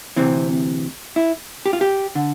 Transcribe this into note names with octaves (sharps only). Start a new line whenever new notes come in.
D2 C3 E3 C4
E4
G4
F4
G4
D3